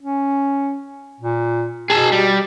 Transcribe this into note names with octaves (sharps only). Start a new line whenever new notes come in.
C#4
A#2
B2 G#4 A5
G3